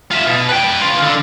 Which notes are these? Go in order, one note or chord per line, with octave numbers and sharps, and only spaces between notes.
F4 E5
B2
B4 G5
C#3 F4
D3